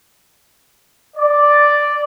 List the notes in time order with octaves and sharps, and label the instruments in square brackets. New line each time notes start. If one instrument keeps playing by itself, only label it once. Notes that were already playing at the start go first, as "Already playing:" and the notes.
[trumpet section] D5